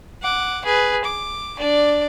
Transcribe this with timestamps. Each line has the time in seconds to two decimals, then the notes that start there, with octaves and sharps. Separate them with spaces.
0.22 F#5 D6
0.65 G#4 B4
1.04 D6
1.59 D4 D5